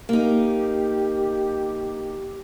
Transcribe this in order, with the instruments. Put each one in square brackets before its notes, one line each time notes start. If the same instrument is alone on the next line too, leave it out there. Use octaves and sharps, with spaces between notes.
[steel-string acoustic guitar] A#3 D#4 [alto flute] G4